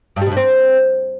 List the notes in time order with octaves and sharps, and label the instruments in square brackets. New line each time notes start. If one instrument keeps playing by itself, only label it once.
[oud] G2
G3
B2
G2
C4